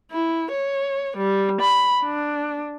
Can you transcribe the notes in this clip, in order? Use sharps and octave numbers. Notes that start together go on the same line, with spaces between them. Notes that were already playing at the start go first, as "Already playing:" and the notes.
E4
C#5
G3
B5
D4